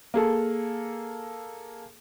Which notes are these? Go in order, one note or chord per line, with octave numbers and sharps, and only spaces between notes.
A#3 G#4 A4